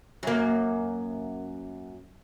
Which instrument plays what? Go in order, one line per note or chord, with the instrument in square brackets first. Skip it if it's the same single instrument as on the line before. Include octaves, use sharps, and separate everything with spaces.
[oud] F#2 A#3